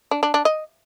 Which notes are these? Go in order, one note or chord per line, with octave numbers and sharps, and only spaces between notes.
D4
D4
D4
D#5